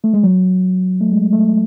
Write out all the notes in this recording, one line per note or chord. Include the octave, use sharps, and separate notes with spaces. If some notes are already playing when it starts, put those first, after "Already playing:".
A3
G#3
F#3
A3
G#3
A3